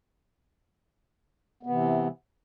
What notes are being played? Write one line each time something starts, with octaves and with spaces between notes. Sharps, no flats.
C3 E3 B3